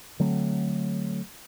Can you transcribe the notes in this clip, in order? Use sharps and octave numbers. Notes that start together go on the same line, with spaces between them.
D3 F#3 A3 C4